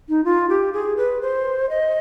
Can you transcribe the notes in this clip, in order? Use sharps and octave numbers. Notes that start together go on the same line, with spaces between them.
D#4
F4
G4
G#4
B4
C5
D#5